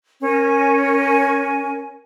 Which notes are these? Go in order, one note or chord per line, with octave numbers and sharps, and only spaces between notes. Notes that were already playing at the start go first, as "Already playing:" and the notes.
C#4 A#4 G#5